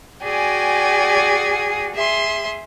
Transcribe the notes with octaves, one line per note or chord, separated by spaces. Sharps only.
F#4 G#4 D5 G5 G#5
G#4 E5 C6